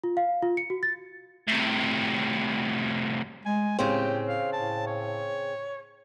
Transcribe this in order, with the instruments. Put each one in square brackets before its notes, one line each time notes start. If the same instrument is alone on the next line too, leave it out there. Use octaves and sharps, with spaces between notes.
[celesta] F4
F5
F4
C#7
F#4
A6
[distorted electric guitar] A2 C3
[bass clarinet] G#3 [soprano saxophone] G#5
[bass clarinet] A2 [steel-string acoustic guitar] C#3 C4 [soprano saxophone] G4
[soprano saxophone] F5
[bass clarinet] A2 [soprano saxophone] A5
[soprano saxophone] C#5